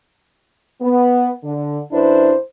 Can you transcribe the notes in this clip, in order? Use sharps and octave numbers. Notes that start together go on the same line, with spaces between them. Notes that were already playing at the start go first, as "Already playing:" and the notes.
B3
D3
F#2 D4 E4 B4 C5